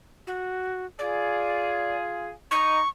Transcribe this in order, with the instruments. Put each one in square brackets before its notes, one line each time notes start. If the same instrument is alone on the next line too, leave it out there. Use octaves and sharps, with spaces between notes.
[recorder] F#4
[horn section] F4 G#4 [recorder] D5
[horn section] D#4 [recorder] C#6